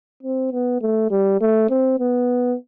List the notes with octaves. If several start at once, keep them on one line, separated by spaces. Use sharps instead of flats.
C4
B3
A3
G3
A3
C4
B3